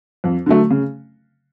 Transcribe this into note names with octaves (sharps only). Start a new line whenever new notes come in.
F2
D3 F#3 A3
C#3